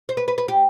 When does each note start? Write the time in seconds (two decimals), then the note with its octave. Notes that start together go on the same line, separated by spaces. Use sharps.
0.09 C5
0.17 B4
0.28 B4
0.38 B4
0.48 G4